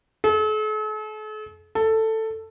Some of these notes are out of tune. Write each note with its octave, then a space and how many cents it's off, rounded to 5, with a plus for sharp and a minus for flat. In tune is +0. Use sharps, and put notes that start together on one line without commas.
A4 -45
A4 +10